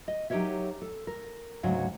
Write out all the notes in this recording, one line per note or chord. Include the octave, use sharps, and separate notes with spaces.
D#5
F#3 D#4 G4 A#4 C#5 E5
A4
A#4
D2 G#2 C#3 F#3